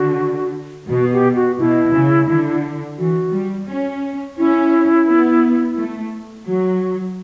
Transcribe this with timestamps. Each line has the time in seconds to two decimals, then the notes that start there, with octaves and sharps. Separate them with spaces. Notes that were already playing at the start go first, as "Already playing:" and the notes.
Already playing: D3 F#4
0.89 B2 F#4
1.13 G4
1.36 F#4
1.58 B2 E4
1.94 C#3
2.29 D3
2.98 E3 F#4
3.33 G3
3.68 C#4
4.38 C#4 E4
5.07 B3
5.77 A3
6.47 F#3 F#4